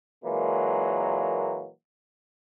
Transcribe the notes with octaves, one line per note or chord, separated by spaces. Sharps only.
A#2 E3 F#3 G#3 A#3